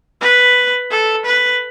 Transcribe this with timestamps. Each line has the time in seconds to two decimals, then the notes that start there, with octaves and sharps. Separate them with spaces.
0.21 B4
0.91 A4
1.25 B4